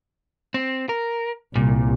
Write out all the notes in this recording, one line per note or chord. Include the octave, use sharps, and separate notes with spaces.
C4
A#4
C2 A#2